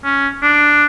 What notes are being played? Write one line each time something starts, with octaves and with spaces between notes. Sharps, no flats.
C#4
D4